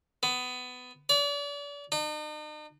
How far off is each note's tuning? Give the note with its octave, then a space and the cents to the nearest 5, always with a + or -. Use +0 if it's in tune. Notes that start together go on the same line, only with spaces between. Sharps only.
B3 +20
D5 -40
D#4 -45